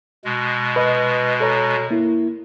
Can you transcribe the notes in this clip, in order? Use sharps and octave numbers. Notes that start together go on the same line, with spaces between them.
B2 G#3
B4 D#5
A4 C#5 A#5
A#3 E4